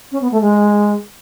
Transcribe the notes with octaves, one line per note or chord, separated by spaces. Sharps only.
C#4
B3
A3
G#3